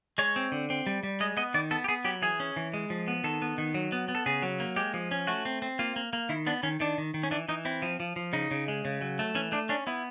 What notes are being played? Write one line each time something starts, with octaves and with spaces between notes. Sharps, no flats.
G#3 C#5
C4
D3
C4
G3
G3
G#3 D#5
B3 D#5
D#3 D5
B3 A4
G4
B3 G#4
F#3 G4
E3 G#4
C#4
E3
G#3
F3
B3
D#3 A4
B3
D#3
F#3
B3
B3
A4
C#3 G#4
F#3
A#3
G#3 G4
F3
C#4
A3 F#4
C4
C4
A#3 F4
A#3
A#3
D#3 E4
B3 D4
D#3 C#4
D#3 D4
D#3
D#3
C#4
E3 D4
E3 D#4
C4 E4
F3
F3
F3
C#3 D#4
C#3
G#3
C#3
F#3
A3
E3 C#4
A3 D4
C#4 D4
B3 E4